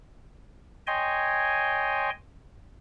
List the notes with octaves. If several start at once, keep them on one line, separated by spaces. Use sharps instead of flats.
C#5 D#5 G5 G#5 C6